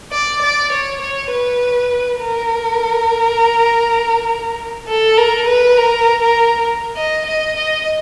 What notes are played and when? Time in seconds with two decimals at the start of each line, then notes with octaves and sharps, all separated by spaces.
0.12 D5
0.42 D5
0.72 C#5
1.01 C#5
1.31 B4
2.21 A#4
4.88 A4
5.17 A#4
5.48 B4
5.77 A#4
6.22 A#4
6.96 D#5
7.26 D#5
7.56 D#5